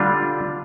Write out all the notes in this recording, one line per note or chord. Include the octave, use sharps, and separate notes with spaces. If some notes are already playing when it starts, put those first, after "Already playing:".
Already playing: D3 G3 D4 F4